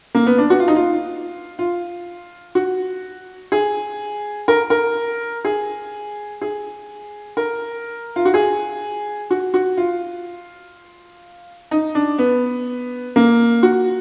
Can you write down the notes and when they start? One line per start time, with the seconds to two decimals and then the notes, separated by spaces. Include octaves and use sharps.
0.15 A#3
0.26 B3
0.38 D4
0.50 F#4
0.60 F4
0.68 D#4
0.76 F4
1.59 F4
2.55 F#4
3.52 G#4
4.48 A#4
4.70 A#4
5.45 G#4
6.41 G#4
7.37 A#4
8.16 F4
8.25 F#4
8.34 G#4
9.31 F#4
9.54 F#4
9.77 F4
11.71 D#4
11.95 D4
12.18 B3
13.16 A#3
13.63 F#4